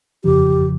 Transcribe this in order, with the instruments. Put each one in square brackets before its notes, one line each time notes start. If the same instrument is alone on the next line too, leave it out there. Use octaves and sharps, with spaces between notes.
[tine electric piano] G1 F2 C#3 F3 [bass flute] G4